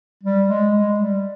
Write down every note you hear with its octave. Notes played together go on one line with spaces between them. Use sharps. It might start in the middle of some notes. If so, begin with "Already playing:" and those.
G3
G#3
G#3
G3